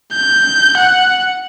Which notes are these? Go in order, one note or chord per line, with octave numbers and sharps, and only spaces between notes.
G6
F#5